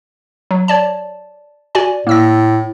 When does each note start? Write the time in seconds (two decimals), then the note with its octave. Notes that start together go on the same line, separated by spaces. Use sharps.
0.51 F#3
0.68 C#5 D5 A5
1.75 F#4 D5 G#5
2.07 A2 A#3 E6 A#6